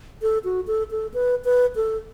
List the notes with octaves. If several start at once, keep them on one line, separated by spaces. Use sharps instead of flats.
A4
F#4
A4
A4
B4
B4
A4